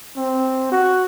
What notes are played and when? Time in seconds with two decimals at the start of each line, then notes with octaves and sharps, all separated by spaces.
0.17 C4
0.72 F#4